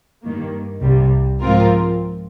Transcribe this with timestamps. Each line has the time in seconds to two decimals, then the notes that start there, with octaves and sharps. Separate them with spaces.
0.22 G2 D#3 A#3
0.80 C2 C3 G3
1.40 G#2 F3 C4 F4 A#4